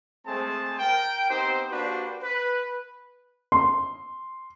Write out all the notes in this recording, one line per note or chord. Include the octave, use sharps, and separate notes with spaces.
G#3 A3 C4 G#4 C5 A5
A#4 G5
B3 C4 D#4 G4 C5
A#3 D4 F#4 G4 B4 C5
B4
C6